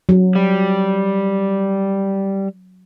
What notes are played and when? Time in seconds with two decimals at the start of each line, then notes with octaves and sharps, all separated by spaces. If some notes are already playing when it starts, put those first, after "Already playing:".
0.09 F#3
0.36 G3